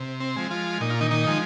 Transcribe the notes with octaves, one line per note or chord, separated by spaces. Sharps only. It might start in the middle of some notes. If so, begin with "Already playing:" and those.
Already playing: C3
C4
F3 G#3
F3 F4
A#2 D#4
F4
D#3 D#4
D#3 D#4
F3 G#3